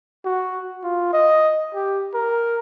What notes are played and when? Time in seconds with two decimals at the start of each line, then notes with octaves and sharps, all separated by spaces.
0.25 F#4
0.84 F4
1.13 D#5
1.74 G4
2.14 A#4